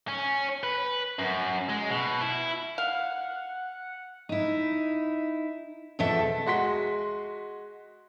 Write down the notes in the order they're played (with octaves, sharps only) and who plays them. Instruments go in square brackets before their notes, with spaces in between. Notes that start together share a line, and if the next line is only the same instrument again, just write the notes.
[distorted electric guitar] C#4
B4
F#2
G#3
B2
E4
[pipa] F5 [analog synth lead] F#5
[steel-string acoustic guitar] D#4 E4
E2 B2 F3 A4 E5
[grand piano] G#3 F#4 C6 B6